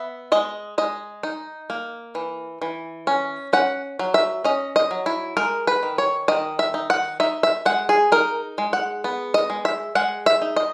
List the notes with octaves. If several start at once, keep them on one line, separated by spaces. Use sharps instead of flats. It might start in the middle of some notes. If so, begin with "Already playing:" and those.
Already playing: B3 E5
G#3 D#5
G#3 D#5
D#4
A#3
E3
E3
C#4
C#4 F#5
F#3
E5
C#4 D#5
D#5
F#3
E4
G#3 A#4
B4
D#3
C#5
D#3 D#5
E5
D#4
F#5
D#4 E5
E5
G#3 F#5
G#4
D#4 A#4
G#3
F#5
B3
D#5
G#3
E5
G#3 F#5
E5
D#4
D#5